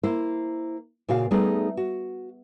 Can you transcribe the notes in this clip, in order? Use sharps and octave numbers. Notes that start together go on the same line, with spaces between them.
A#3 E4 C5
A#2 C#3 F#4 F5
G3 A3 B3 D#4 G#4
F#4